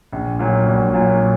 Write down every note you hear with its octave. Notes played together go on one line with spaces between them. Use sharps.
A#1
A#2 F#3
A#1
A#2 F#3